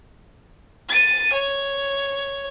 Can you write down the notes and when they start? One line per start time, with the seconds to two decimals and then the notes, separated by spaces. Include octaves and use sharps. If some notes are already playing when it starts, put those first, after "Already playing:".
0.89 A6 D#7
1.33 C#5